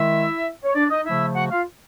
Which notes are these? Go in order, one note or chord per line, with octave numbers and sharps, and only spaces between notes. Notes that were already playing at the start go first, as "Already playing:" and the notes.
Already playing: D#3 G#3 E4 E5
C#5
D4 D5
D#4 D#5
C#3 F3 A3 E4 E5
F#4 F#5
F4 F5